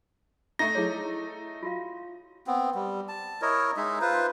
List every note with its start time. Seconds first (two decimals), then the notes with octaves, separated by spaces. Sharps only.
0.59 A3 D#4 A#6
0.75 E4 G#4 C#5
1.63 F4 F#4 F5
2.47 B3 C4
2.75 G3
3.08 A5
3.42 E4 A#4 C#5 D#5
3.77 G#3 D#4 E5
4.01 F4 B4 C5